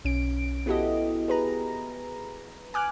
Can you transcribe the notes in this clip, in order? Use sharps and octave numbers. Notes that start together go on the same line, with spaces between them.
B1 C#4 D7
B3 E4 F#4 G4 A4 D#5
G#4 B4 A#5
G#5 D6 F6 F#6